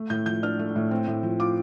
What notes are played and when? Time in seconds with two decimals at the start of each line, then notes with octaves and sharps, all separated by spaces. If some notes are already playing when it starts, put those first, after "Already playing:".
Already playing: A3
0.10 A2 G6
0.26 F3 G6
0.43 D4 F6
0.59 A3
0.76 A2
0.91 C4
1.08 A2
1.23 F3
1.39 F4 D6